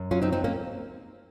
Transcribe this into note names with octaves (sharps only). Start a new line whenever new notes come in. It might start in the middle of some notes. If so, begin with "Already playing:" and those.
Already playing: F#2
F#3 C#4 F4
C4 D#4
F#3 C4 D#4
A#3 C#4